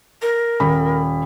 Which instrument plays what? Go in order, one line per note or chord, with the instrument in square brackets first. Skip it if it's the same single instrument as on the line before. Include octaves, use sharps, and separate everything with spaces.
[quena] A#4
[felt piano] D#1 B5